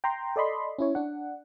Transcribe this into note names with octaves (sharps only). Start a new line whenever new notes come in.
G5 A#5 C6
A4 D5 D#5 B5 C6
C#4 E4 C#5
D4 F#5